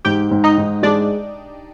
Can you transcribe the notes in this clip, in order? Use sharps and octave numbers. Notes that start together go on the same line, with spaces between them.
G#2 G4 G5
G#2
D#4 D#5
G#2
G#3 D4 D5